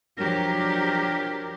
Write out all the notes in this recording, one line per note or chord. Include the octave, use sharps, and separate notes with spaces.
F3 F#3 D4 G4 A#4